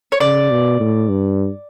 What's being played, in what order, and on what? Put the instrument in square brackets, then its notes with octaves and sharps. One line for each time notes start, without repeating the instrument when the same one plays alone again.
[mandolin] C#5
[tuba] C#3 [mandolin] D5
[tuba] B2
A2
G2